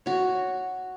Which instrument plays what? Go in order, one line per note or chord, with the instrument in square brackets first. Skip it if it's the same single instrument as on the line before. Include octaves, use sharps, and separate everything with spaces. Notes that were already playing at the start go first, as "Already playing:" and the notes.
[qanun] F#4 C#5